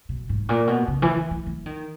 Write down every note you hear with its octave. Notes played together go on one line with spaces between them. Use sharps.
B2
G#2
A#2
B2
C#3
E3
E3
E3
E3
D#3